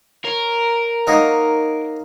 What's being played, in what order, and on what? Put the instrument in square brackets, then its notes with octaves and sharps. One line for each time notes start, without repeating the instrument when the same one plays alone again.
[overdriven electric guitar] A#4 [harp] C#5
[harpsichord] A#3 D#5 F#5 [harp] D#4 C#5 A#5